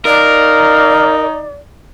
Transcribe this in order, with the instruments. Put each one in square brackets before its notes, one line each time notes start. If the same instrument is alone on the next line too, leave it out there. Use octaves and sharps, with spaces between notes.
[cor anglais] D#4 [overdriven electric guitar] A#4 [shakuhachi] D5 [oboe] F5